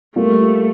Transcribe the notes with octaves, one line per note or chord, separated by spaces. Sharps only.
G3 A3 A#3 F4 A#4